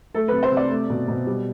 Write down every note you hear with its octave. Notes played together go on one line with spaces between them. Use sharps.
A3 A4
C3 B4
C5
C3
D5
A3
B2
B2
G3